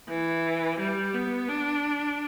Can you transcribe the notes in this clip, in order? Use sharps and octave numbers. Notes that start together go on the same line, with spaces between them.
E3
G3
B3
D4